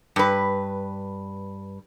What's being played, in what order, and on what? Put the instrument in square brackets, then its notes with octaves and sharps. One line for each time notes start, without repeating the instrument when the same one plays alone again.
[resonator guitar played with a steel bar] G2 B4